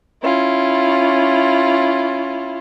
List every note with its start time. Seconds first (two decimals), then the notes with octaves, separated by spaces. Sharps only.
0.22 C#4 E4 F4